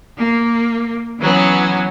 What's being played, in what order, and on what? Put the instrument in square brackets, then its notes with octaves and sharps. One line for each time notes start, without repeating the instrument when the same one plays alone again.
[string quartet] A#3
E3 F#3 B3 C#4